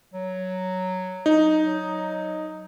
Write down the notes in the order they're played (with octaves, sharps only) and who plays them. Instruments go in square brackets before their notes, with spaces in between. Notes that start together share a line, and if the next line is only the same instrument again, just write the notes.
[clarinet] F#3
[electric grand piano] D#4
[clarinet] F#3